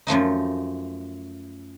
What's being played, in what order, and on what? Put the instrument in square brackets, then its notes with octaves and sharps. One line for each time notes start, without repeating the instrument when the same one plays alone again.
[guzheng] F#2 F3 A3 D#4